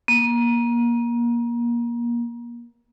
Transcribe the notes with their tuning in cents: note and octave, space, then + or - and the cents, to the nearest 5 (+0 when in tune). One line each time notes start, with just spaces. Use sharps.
A#3 +25